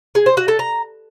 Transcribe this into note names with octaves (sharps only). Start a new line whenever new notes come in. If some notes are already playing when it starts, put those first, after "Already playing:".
G#4
C5
F#4
A4
A#5